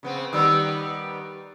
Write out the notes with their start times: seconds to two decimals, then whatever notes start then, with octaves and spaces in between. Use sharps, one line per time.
0.03 C#3 B3 C4
0.33 D#3 G3 B3 E6